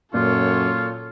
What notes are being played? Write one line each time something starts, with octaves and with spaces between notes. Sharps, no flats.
F#2 A#2 F4 A4 C#5